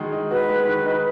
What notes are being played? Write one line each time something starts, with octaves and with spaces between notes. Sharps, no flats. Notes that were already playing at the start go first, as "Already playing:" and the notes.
Already playing: D#3 G#3 F#4
D#4
F#4 B4
G#3
D#3
D#4